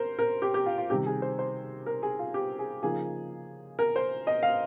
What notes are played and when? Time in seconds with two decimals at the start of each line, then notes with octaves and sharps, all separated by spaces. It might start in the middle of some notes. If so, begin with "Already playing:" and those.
Already playing: A#4 C5
0.19 A#4
0.42 G4
0.54 G4
0.66 F4
0.78 F4
0.90 C3 D#3 G3 G4
1.06 G#4
1.22 C5
1.39 C5
1.86 A#4
2.03 G#4
2.19 F4
2.34 G4
2.59 G#4
2.82 C#3 F3 A#3 D#4 G#4
3.79 A#4
3.96 C5
4.27 D#5
4.43 F5